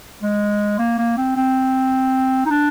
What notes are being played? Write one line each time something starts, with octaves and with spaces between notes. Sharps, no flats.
G#3
A#3
A#3
C4
C4
D#4
D4